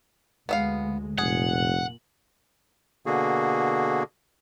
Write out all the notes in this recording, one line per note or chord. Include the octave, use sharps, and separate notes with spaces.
D2 G#3 B3 E5 F5
F1 A#2 G#4 F#5
B2 D3 A#3 F#4 G#4